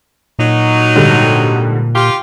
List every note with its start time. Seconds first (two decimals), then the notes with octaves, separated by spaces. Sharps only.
0.39 A#2 F#3 D#4
0.96 G#2 D3 G3
1.95 F4 G4